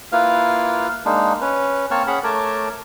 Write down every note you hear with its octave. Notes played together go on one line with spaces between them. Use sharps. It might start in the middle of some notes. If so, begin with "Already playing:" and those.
A#3 E4 F4 B4 F5 F6
G#3 A#3 D4 D#4
C#4 B4
A#3 C4 C#5 A5 C#6 F6
C#4 G#4 F#5 B5
A3 A#4 C#5 A5 D6